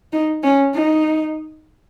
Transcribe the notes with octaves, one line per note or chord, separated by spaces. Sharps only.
D#4
C#4
D#4